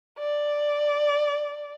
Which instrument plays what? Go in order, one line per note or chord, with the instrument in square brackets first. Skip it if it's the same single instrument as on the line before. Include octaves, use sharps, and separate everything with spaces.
[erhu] D5